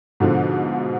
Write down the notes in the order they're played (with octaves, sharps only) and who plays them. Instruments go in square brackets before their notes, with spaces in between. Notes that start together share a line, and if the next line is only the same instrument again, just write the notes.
[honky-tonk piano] G#2 B2 D3 F3